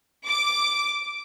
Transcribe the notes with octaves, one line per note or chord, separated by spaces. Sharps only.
D6